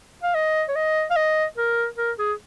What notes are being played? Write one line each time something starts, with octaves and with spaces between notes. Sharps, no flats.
F5
D#5
C#5
D#5
F5
D#5
A#4
A#4
G#4